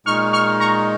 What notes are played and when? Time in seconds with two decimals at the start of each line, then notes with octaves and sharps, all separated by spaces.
0.06 A#2 G#3 D#4 C#6 F6
0.33 C#6 F6
0.60 A#5 C#6